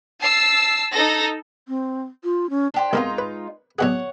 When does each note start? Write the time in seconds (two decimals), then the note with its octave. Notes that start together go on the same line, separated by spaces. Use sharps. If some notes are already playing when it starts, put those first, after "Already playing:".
0.21 A5 E6 C7
0.91 D#4 A4 A#6
1.68 C4
2.24 F4
2.50 C#4
2.74 D4 G4 C5
2.93 C2 G#3 B3 D#4 F4 A#4
3.18 B4
3.79 B1 B2 G#4 C#5 D5 F#5